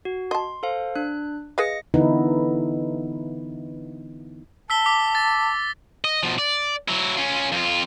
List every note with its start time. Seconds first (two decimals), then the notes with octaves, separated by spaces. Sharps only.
0.05 F#4
0.31 D#5 A5 C6
0.63 A4 C5 F5
0.96 D4 F#6
1.58 G#4 B4 D#5 F5 A#6 C#7
1.94 D3 E3 B3 D#4 E4
4.70 A5 E6 B6 G7
4.86 D6 B6
5.15 A6
6.05 D#5
6.23 B2 F3
6.39 D5
6.88 F#3 E4
7.17 C#4 F4
7.52 F2 F4